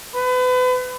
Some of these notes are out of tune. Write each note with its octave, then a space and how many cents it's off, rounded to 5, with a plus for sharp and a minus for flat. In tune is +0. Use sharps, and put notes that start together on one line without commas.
B4 +35